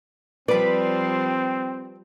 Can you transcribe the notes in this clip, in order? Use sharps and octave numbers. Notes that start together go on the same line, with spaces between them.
F3 G3 C4 B4 D5 B5